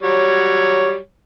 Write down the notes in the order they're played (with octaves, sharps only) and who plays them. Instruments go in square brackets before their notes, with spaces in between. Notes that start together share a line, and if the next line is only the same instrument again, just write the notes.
[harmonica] F#3 G3 C#5